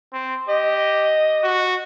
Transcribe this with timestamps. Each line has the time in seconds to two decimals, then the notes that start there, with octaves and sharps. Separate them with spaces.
0.13 C4
0.49 G4 D#5
1.44 F#4